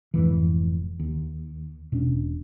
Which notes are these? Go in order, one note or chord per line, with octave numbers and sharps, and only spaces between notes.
F1 F2 G#2 E3
D#2
E1 B2 C#4 D4